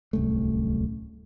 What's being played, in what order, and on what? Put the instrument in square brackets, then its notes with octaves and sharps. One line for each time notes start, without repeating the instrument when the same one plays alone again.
[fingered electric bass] D1 C2 F#2 A3